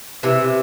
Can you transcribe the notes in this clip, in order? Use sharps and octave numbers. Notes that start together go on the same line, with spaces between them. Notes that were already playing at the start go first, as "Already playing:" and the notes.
C3 E3